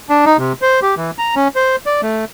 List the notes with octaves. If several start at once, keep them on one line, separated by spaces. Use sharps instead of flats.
D4
D#4
C3
C5
G4
E3
A#5
C#4
C5
D5
A3